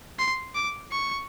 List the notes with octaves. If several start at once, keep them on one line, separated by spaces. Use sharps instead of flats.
C6
D6
C#6